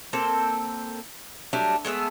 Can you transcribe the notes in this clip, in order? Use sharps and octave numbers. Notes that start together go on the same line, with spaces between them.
A#3 C4 A4 C5
F#3 G3 A3 D4
G#3 A3 B3 E5